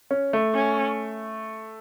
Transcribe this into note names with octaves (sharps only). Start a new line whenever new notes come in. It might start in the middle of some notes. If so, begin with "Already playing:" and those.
C#4
A3
C#4